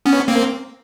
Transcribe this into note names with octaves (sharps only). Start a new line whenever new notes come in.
B3 C#4
A#3 C4